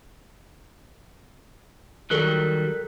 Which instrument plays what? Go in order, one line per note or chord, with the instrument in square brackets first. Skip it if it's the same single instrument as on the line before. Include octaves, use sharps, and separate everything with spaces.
[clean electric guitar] D#3 F#3 G3 [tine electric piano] A4 A#4 F#6